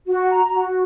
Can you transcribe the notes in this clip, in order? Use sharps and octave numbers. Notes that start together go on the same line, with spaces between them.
F#4
A#5
F#4